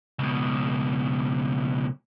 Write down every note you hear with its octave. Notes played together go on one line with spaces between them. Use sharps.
C#2 B2